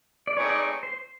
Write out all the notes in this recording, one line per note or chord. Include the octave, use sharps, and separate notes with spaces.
D5
A3 C4 D#4 G#4 B4 C#5
D5
C#5
C5